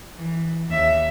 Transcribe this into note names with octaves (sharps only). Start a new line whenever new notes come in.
E3
D#2 E5